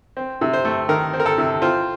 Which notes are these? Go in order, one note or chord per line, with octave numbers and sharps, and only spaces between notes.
C4
C3
C5
A3
D#3 A#4
C4
A#4
A4
C3
C4 F4